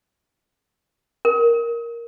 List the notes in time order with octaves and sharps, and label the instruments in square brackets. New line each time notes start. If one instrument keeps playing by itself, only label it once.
[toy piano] A#4